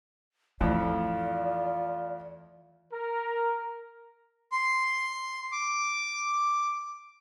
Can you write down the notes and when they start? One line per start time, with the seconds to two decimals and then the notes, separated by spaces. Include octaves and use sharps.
0.61 F2 A2 E3 F4 D5
2.91 A#4
4.52 C6
5.52 D6